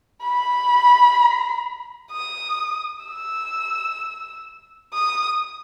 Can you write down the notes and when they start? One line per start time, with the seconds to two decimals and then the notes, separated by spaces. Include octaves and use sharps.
0.22 B5
2.11 D#6
3.05 E6
4.93 D#6